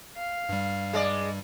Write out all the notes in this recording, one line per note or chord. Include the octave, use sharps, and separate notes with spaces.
F5
G2 G3
G#3 D5